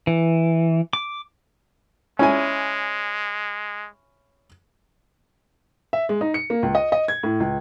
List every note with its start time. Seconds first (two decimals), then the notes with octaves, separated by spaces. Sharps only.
0.07 E3
0.93 D6
2.19 G#3 C#4 E4 G#5
5.93 E5
6.09 G#3
6.21 D#4
6.34 C#7
6.50 A#3
6.63 C#2
6.75 D#5
6.92 D#5
7.08 G#6
7.23 A2
7.40 C#2